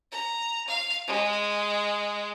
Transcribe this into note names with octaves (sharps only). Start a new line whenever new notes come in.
A#5
F5
G#3